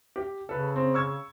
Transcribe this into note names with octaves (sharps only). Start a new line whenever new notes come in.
G4
C#3 A4 B4
C4
C#6 E6 G#6